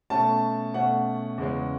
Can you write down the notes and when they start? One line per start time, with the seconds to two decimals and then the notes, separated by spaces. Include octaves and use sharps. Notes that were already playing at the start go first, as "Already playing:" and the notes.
0.10 B2 A3 C#4 A5
0.74 B2 A3 C#4 F#5
1.38 E2 C#3 G#3 C#4